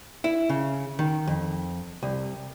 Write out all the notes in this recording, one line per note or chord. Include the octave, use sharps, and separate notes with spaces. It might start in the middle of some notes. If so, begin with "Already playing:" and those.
E4
C#3
D#3
F2
C2